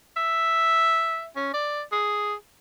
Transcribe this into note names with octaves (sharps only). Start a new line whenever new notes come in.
E5
C#4
D5
G#4